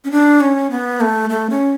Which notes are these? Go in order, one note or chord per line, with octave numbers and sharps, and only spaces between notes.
C#4
D4
C#4
B3
A3
A3
C#4